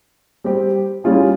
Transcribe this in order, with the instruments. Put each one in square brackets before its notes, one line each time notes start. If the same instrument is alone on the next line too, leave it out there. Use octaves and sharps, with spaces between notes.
[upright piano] G3 C4 G4
G3 C#4 F4 G#4